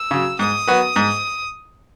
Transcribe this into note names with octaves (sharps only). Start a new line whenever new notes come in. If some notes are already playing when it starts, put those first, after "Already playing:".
Already playing: E6
C#3 F#3
G#2 D#6
F#3 B3 F#4 B4
G#2